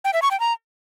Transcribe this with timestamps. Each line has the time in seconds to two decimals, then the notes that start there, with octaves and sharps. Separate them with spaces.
0.05 G5
0.13 E5
0.22 C#6
0.31 G5
0.40 A#5